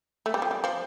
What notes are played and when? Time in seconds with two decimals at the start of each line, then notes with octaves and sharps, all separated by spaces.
0.26 A3
0.34 G3
0.42 F3
0.51 G3
0.64 F3